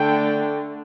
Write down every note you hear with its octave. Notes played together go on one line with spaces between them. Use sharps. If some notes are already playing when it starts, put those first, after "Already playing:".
Already playing: D3 A3 D4 G5